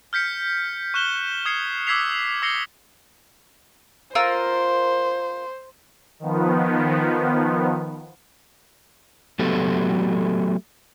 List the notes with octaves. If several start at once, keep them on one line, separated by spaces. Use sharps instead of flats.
F6 G6 B6 C#7
C#6 F#6 E7 G7
D#6 G#6 C7 C#7
D6 E6 G#6 B6 C7 F7
D6 E6 A#6 C7 C#7 G7
F4 A#4 C5 E6
D#3 F3 B3
F#3 A3 B3 F#4 G4 A4